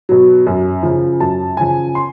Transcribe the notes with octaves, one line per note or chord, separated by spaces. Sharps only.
B2 F#3
F#2
C#3 F3
F#2 A5
C#3 F3 G#5
C6